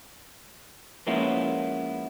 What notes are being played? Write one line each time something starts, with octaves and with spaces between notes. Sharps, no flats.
F3 G#3 A#3 B3 C#4 E4